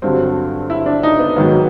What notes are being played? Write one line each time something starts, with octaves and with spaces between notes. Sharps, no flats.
G2 D3 F#3 C4
E4
D4
D#4
B3
G#2 D#3 F#3 B3